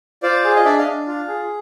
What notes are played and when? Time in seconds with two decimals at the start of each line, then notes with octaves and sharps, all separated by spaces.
0.23 F4 C5 D5
0.44 G#4
0.56 D#5
0.65 D4 D5 E5
0.79 D#5 F5
0.87 D4
1.07 F4
1.28 G#4